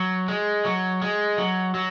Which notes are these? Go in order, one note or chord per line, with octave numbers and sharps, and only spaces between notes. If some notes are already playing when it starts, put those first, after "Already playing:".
Already playing: F#3
G#3
F#3
G#3
F#3
F#3